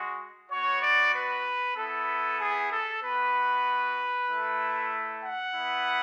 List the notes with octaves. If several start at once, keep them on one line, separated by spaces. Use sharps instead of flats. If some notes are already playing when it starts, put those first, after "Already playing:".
Already playing: G#3 F#4
B3 F#4 C#5
D5
B4
B3 E4 A4
G#4
A4
B3 F#4 B4
A3 E4
F#5
B3 E4